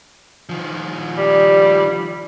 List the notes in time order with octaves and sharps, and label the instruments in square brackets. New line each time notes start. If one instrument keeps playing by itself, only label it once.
[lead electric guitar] D#3 F3
[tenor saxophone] G3